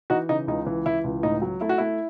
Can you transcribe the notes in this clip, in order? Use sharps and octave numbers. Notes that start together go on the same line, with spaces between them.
E3 D#4 F#4
C#3 D#4
C#2 D#4
E3
E3 E4
C#2
A2 D#4
F#3
A3 E4
F#4
A3 E4